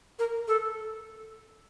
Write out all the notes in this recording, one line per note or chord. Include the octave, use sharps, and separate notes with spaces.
A#4
A4